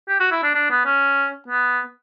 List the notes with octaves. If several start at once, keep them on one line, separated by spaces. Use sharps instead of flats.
G4
F#4
E4
D4
D4
B3
C#4
B3